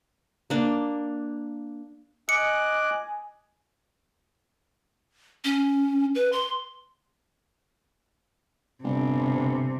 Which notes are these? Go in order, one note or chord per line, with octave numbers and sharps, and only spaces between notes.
A#3 D4
D#5 G#5 D6 F#6 C#7
C#4
B4
C6
G1 C3